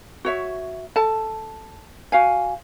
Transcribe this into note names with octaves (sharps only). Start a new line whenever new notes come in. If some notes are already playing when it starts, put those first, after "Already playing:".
F#4 C#5 E5
A4 A5
F#4 F5 G#5